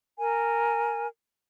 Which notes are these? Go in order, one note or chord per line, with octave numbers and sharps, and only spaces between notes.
A#4 G#5